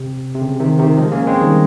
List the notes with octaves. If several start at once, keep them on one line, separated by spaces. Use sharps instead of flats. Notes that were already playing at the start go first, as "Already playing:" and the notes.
Already playing: C3
C3
C#3
C3 D#3
C3 D#3
F3 G#3
A#3 C#4
G#3 C4
D#3 G3